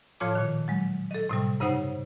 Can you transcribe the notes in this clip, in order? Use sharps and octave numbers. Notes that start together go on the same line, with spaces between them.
A2 F3 F4 C#5 A5 D6
A#2 D#3
F#3 G#3
A4 D#5
A2 C3 G3
G2 C#3 D#4 C5 F#5